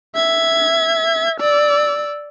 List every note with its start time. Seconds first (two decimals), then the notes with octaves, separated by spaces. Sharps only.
0.15 E5 G#6
1.40 D5 E6